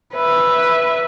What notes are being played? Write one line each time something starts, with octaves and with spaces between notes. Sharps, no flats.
B4 E5